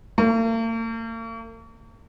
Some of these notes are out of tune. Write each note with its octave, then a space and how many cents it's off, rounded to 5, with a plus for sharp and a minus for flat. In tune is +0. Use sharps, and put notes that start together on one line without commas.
A#3 -45